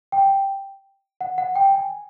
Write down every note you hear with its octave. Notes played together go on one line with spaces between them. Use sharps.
G5
F#5
F#5
G5
G#5